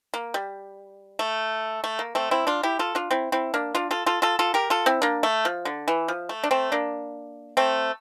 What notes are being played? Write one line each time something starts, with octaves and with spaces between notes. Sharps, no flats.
A#3
G3
A3
A3
A#3
A3 C4
C4 E4
D4 F4
E4 G4
F4 A4
D4 F4
C4 E4
C4 E4
A#3 D4
D4 F4
F4 A4
F4 A4
F4 A4
F4 A4
G4 A#4
F4 A4
C4 E4
A#3 D4
A3
F3
D3
E3
F3
A3
D4
A3 C4
A#3 D4
A3 C4